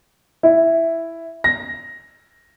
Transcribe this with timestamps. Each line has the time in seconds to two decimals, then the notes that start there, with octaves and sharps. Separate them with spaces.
0.43 E4
1.44 A#6